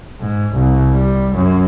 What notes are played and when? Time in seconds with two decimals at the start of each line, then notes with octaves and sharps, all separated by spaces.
0.20 G#2
0.55 C2
0.93 G3
1.35 F#2